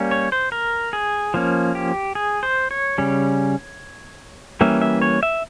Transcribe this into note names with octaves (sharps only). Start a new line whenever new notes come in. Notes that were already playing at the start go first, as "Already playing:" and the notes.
Already playing: G3 A#3 C#4
C#5
C5
A#4
G#4
F3 A#3 C#4
G4
G#4
C5
C#5
C#3 G3 C#4
E3 G3 A#3 C#4 E5
E5
C#5
E5